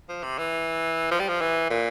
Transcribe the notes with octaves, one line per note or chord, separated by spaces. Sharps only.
F3
C3
E3
F3
G3
F3
E3
A#2